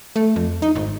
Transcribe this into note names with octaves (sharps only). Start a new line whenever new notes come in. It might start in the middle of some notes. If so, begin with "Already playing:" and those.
A3
F2
D#4
G#1